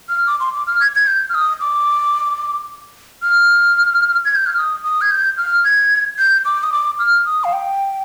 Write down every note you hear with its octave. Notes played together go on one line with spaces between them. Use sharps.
F6
D6
C6
D6
F6
G#6
G#6
G6
F6
D#6
D6
F6
G#6
G6
F6
D#6
D#6
G#6
G6
F6
G#6
G6
D6
D#6
D6
F6
D#6
F5
G5